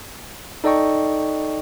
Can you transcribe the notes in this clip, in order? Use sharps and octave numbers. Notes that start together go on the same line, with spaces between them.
D#4 A4 D5 D#5 G5 C#6